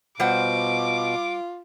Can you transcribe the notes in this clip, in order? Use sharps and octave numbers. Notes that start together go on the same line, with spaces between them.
B2 G3 F4 C5 F#5 D6